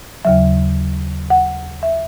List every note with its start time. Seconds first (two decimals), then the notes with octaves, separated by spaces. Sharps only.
0.25 D#2 C#3 F#3 E5
1.30 F#5
1.83 E5